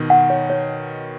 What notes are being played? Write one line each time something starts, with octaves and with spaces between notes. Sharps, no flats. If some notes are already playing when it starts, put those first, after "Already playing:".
Already playing: B2 D#3
F#5
C#5
C#5